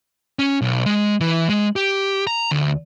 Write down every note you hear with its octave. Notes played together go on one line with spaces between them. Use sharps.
C#4
B1
G#3
E3
G#3
G4
A#5
D2